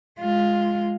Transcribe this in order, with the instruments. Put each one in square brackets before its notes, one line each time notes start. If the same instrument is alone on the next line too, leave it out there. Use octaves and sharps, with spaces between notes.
[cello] G#3 F4